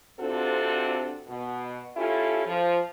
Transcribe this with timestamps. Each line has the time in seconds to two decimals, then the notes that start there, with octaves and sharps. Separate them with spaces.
0.20 C3 C4 D4 F4 F#4 A4
1.27 B2
1.96 C#4 E4 F4 G4 A4
2.46 F3